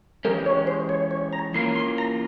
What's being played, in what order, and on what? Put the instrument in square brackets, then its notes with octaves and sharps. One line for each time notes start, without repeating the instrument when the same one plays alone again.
[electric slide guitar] E3 G#3 C#4 G4 [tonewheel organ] A#4
[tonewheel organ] C#5
C5
C#5
C#5
A#5
[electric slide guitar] E3 A#3 C#4 F4 A#4 [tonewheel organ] C6
[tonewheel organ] C6
A#5